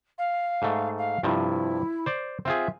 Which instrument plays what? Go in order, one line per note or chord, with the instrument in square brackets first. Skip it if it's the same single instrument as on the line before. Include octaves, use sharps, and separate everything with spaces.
[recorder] F5
[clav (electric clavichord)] G#2 A3
[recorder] F5
[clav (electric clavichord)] G2 C3 F3 [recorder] E4
[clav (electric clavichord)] C5 D5
[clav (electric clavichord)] C4 F4 G#4 [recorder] E5